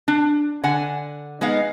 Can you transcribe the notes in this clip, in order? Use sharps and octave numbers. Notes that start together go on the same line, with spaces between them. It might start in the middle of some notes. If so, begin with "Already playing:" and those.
D4
D3 F#5 G#5
G#3 B3 D#4 F5